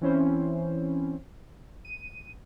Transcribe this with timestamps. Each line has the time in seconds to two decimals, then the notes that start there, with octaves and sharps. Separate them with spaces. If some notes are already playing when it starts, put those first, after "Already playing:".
0.01 E3 C4 C#4 E4 C5
1.85 D#7